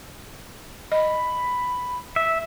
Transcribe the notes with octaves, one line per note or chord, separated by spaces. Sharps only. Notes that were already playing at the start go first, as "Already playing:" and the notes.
D#5 B5
E5